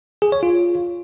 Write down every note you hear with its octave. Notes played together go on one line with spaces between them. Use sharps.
G#4
C#5
F4